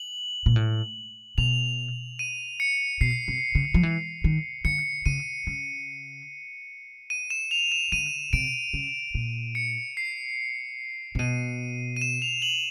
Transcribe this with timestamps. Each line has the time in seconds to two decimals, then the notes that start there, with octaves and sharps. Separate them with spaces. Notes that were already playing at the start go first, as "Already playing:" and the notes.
Already playing: F#7
0.46 A#2
0.56 A2
1.38 B2 F7
2.19 D#7
2.60 C#7
3.01 B2 C7
3.28 C3
3.55 C#3
3.74 F3
3.83 E3
4.24 D#3
4.65 D3 C#7
5.06 C#3 D#7
5.47 C#3
7.10 D#7
7.30 E7
7.51 F7
7.72 E7
7.92 D3 D#7
8.33 C3 D7
8.74 C#3
9.15 A#2
9.55 C#7
9.97 C7
11.15 C3
11.19 B2 D#7
11.96 D#7
12.02 E7
12.22 F7
12.42 F#7